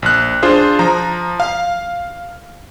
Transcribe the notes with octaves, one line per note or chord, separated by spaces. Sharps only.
A#1 F#6
D4 F4 G#4 C5
F3 A#5
F5